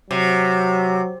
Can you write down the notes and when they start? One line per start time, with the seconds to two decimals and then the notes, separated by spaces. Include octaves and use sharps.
0.10 C3 F#3